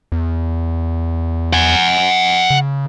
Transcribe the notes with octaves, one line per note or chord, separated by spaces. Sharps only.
E2
F#5 G#5
C#3